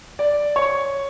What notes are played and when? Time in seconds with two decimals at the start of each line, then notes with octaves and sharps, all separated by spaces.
0.19 D5
0.56 C#5 C#6